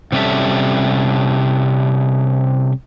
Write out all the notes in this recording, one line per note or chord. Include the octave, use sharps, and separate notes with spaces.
C3 G3 C#4 A4 E5